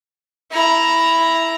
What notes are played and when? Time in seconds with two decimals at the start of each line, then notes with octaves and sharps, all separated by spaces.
0.51 E4 A#5